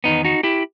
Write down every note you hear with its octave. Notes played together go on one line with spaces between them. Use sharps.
E2 D#3 B3 D#4
D#4 F#4
E4 G4